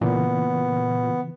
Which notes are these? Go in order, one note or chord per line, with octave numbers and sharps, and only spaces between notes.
A#2 C#3 E3 B3